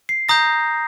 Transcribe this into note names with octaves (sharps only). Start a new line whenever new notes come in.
C7
A#5 D#6 G6 A#6